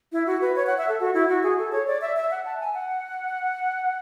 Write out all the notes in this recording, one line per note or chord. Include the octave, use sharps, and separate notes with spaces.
E4
F#4
B4
C#5
F#5
E5
A4
F#4
E4
F#4
G#4
A4
C#5
D5
E5
E5
F#5
A5
G#5
F#5